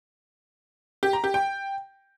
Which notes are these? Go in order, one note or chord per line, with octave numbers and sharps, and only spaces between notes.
G4
A#5
G4
G5